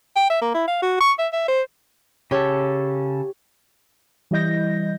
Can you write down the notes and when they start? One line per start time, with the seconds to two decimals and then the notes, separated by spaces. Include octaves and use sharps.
0.16 G5
0.30 E5
0.41 A#3
0.54 E4
0.68 F5
0.82 F#4
1.00 C#6
1.19 E5
1.33 E5
1.48 C5
2.31 C#3 G4 A4 C#5
4.31 E3 G3 E4 D#5 G6 A#6